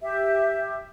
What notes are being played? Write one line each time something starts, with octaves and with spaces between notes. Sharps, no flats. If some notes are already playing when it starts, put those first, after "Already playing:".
G4 E5